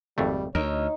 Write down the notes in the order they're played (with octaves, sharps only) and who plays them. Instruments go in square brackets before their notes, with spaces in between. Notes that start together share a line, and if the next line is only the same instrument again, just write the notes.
[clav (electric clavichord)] G#1 F2 A3 [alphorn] G3
[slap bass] D2 [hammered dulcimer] D#4 [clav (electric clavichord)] A#4 [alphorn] C#5